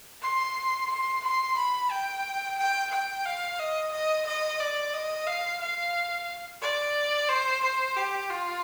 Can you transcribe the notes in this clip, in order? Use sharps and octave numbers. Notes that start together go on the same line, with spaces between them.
C6
C6
C6
B5
G5
G5
G5
F5
D#5
D#5
D#5
D5
D#5
F5
F5
D5
C5
C5
G4
F4